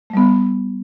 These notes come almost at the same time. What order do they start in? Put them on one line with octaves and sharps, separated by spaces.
A3 G3 B3